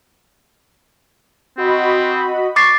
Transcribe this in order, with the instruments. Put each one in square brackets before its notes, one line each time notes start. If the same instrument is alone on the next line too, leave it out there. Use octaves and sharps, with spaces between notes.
[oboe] C4 [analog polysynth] F#4 D#5 B5
[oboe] C#6 [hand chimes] D6 A6 C7